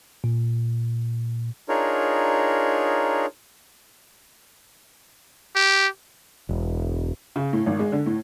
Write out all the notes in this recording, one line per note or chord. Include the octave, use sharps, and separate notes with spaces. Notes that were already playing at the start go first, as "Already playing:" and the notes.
A#2
D4 D#4 F4 G#4 A#4 C#5
G4
E1
C#3
A2
G#1
G#3
D3
A2